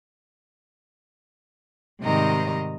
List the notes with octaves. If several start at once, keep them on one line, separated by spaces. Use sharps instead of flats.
G#2 C3 D#3 G3 D#5 A#5